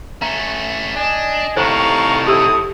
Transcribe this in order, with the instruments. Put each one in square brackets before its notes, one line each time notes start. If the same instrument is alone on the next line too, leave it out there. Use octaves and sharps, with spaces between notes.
[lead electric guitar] A3 C#4 [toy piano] A#5
[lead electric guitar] D4 [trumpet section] D#5 G#5
[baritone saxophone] A2 [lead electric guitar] C3 D#3 [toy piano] C5 [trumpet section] F5 A#5 C#6
[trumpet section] C4 E4 D#6 [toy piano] G4 E6